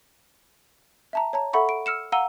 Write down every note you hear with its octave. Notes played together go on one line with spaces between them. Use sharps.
E5 A5 A#5
C#5 A5 A#5
A4 E5 F#5 B5 C#6
D7
E6 F6 C#7 E7
F5 F#5 A#5 E6 D#7 G7